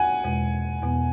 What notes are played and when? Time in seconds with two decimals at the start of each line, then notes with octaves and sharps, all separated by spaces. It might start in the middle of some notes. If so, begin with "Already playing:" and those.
Already playing: F#5 G#5
0.24 E2 B2 G#3
0.82 E2 B2 B3